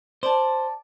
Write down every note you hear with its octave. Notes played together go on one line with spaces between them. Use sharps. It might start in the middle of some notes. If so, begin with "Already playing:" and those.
C5 D5 A5